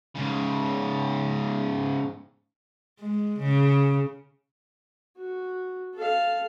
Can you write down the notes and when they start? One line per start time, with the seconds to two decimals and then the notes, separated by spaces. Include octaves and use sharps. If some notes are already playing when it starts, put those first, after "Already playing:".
0.16 G#2 C#3
2.99 G#3
3.39 C#3
5.17 F#4
5.94 A4 F5